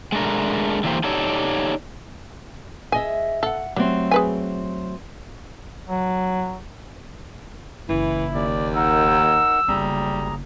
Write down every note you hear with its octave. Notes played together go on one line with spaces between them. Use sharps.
G#3 A3 D4 A#4
D3 E3 A3 A#3 G4 C5
D#4 G4 A4 C#5 D5
G#4 D#5 E5 G#5
A4 F5 F#5
F#3 G3 A3 C4
G#4 B4 G#5
F#3
F#1 E3 E4
D#2 D5
D#4 A#4 F#5 E6
F#1 D2 G3 B3 G#4 A#5